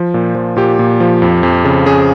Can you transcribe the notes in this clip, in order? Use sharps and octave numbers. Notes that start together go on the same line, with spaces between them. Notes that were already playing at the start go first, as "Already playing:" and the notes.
Already playing: F3
A#2
F3
A#2 G4
A#2
F3
F2
F2
C#3
C#3 G#4